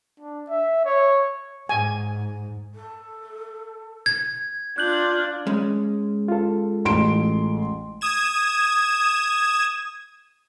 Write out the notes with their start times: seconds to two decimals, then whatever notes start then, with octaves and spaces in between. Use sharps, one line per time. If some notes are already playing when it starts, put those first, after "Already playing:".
0.20 D4
0.50 E5
0.85 C#5
1.69 G#2 G#5
2.74 A4
4.06 G#6
4.78 D4 F4 F#6 G6 F#7
5.47 G#3 C#4
6.28 F4 A4
6.85 A1 C6 D7
8.01 D#6 G#6 E7